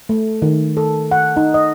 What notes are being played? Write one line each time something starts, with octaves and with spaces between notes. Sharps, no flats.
A3
D#3
A4
F#5
D#4
D#5